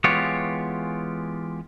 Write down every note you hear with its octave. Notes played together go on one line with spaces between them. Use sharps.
E3 G#3 B3 F4 G4 C#5